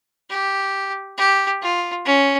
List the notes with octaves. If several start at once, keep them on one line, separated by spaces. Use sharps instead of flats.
G4
G4
F4
C#4